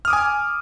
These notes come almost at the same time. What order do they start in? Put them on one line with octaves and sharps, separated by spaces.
F6 D#6 D6 G#5